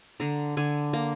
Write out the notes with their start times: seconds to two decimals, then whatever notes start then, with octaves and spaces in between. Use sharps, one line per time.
0.20 D3 A#5
0.57 D3 G#5
0.93 A#3 A#5